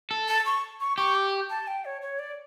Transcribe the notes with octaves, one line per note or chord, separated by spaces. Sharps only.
A4
A5
C#6
C#6
G4 C#6
D6
A5
G5
C#5
C#5
D5